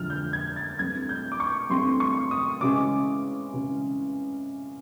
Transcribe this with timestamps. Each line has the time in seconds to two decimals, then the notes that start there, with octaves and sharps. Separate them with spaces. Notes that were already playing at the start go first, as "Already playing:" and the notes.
Already playing: F2 D3 F3 G#3 F6
0.10 G6
0.33 G#6
0.56 A6
0.79 G2 E3 A3 C4 G#6
1.09 G6
1.32 D6
1.40 C#6
1.70 G2 E3 A3 C4 C6
2.00 C#6
2.31 D#6
2.61 C#3 E3 G#3 C#4 D6
3.53 C#3 E3 G#3 C#4